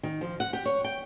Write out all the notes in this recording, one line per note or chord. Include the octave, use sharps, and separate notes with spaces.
D#3
F3
F#5
G4
C#5
G5